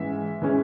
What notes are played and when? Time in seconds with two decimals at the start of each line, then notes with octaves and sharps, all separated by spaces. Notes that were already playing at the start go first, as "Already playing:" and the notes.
Already playing: G#2 E3 G#3 C#4 E5
0.42 E3 G#3 C#4